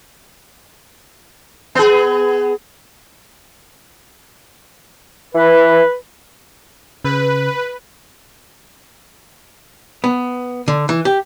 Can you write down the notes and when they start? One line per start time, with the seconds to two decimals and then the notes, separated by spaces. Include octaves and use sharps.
1.75 B3 G#4
5.35 E3 B4
7.04 C#3 B4
10.04 B3
10.68 D3
10.89 E3
11.05 G4